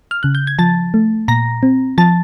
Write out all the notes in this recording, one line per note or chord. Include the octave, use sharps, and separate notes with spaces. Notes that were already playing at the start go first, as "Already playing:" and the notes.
F6
C#3 F#6
G6
G#6
F3 A5 A6
A3
A#2 A#5 A#6
C4
F3 A5 A6